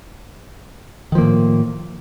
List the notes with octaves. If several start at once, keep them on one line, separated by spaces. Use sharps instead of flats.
A2 D#3 F3 A#3